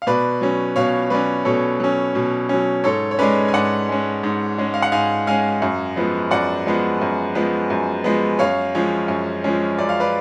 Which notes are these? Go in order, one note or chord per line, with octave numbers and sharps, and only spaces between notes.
F5
B2 B4 D5
F#3 C#4
B2 C#5 F5
F#3 C#4 B4 D5
B2 A4 C#5
F#3 C#4
B2
F#3 C#4
G#2 A4 C#5
C#5
G#3 C#4 B4 D5
G#5
G#2 D5 F#5
G#3 C#4
G#2
G#3 C#4
F5
F#5
G#2 F5 G#5
G#3 C#4 F5 G#5
F#2
F3 G#3 B3
F#2 D5 F#5
F3 G#3 B3
F#2
F3 G#3 B3
F#2
F3 G#3 B3
F#2 C#5 F5
F3 G#3 C#4
F#2
F3 G#3 C#4
F#2 D5
F5
B4 D5